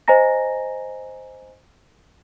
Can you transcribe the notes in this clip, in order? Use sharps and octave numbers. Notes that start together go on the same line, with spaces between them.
C5 D#5 G#5 A#5 A#6